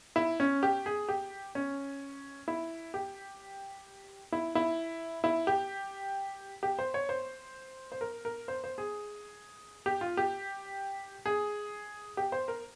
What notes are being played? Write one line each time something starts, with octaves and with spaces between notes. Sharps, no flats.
E4
C#4
G4
G#4
G4
C#4
E4
G4
E4
E4
E4
G4
G4
C5
C#5
C5
C5
A#4
A#4
C5
C5
G#4
G4
F4
G4
G#4
G4
C5
A#4